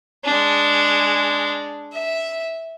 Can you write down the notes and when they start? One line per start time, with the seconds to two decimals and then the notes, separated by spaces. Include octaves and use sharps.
0.24 G#3 D4
1.93 E5